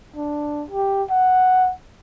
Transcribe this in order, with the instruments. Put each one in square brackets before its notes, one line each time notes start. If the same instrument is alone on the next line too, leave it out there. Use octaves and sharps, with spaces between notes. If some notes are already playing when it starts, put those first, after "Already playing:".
[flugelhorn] D4
G4
F#5